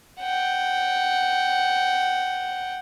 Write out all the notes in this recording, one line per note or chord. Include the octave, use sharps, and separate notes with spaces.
F#5 G5